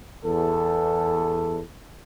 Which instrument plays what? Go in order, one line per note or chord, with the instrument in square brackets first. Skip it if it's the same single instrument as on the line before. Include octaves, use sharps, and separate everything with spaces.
[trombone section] E2 A4